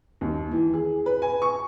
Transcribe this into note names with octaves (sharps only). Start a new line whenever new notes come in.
D#2
E3
G#4
B4
G#5
C#6